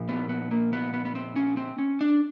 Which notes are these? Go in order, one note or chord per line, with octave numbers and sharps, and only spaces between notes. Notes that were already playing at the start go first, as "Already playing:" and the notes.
Already playing: A#2 F3
B3
B3
A#3
B3
B3
B3
C4
C#4
C4
C#4
D4